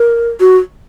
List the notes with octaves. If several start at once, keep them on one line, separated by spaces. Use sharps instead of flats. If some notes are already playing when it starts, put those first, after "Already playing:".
Already playing: A#4
F#4